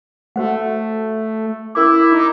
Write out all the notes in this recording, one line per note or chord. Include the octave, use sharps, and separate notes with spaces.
A3 F#4 C5 F#5
C#4 E4 A#4 D6
D#4 D6